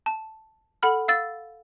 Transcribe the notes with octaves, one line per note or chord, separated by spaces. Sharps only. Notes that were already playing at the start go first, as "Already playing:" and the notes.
A5
A4 F#5 B5 F6
F5 E6 A6